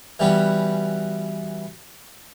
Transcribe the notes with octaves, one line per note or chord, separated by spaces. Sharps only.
E3 G3 B3 C#4 F#4